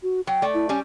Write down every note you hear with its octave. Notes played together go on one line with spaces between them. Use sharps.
F#4
F#3 G5
A3 D5
E4
G3 C#4 G#5